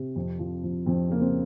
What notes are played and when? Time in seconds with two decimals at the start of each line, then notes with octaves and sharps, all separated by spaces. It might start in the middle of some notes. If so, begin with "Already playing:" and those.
Already playing: C3
0.16 F2
0.39 F3
0.63 F3
0.86 F2 C4
1.09 C#3 A#3
1.21 C4